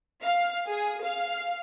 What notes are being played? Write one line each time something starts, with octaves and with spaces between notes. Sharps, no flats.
F5
G#4
F5